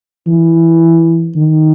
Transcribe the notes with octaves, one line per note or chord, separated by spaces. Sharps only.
E3
D#3